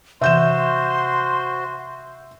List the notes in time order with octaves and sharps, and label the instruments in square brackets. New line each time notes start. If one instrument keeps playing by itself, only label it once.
[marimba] C3 E3 [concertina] F#4 C5 [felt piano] E5 G6 E7 [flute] C6